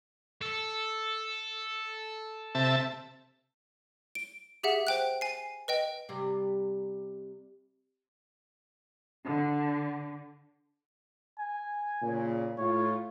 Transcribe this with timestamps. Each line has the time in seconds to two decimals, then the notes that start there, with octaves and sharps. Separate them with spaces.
0.41 A4
2.55 C3 E5 A5
4.15 D7
4.63 G4 G#4 E5 F#5
4.87 C5 G5 F#6
5.21 G#5 C7
5.68 B4 D#5 G5
6.09 C3 G3 G4
9.24 D3
11.39 G#5
12.02 A#2 C#3
12.58 A2 F4 C#5